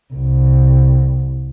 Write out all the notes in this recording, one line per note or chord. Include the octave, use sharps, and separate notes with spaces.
C2